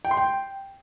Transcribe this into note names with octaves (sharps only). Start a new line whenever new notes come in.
G5
C6
G5